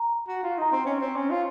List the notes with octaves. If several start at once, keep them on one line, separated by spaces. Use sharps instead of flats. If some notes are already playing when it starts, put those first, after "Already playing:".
Already playing: A#5
F#4
F4
D#4 A#5
C4 C6
C#4
C4
C#4
F4